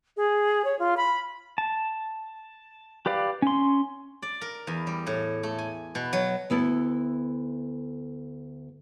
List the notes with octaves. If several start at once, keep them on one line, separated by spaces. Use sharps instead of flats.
G#4
C#5
F4
B5
A5
G4 B4 D5 F5
C#4 C6
D5
A#4
E2
G3
A2
A3
G#5
B2
F#3
D2 B3 E4 A4